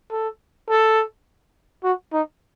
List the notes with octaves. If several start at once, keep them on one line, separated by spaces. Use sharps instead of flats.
A4
A4
F#4
D#4